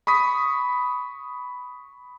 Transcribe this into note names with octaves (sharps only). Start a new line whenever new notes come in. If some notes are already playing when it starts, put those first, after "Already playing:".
B5 C#6 D#6 B6